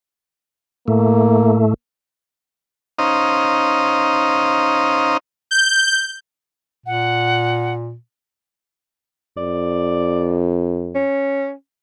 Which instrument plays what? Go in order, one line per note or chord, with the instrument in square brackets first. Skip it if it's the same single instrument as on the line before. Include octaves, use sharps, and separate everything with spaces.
[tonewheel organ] A2 A3 [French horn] A#3
[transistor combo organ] C#4 D#4 C5 D#5 F5 A#5
[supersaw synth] G6
[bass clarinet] A#2 [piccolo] F#5
[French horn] F2 [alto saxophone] D5
[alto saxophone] C#4